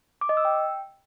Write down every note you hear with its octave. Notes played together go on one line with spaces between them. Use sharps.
D6
D#5
E6
G5